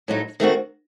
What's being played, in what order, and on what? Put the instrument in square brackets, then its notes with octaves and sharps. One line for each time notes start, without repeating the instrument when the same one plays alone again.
[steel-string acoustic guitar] A2 F#3 A3 D#4
D#3 A3 C4 F#4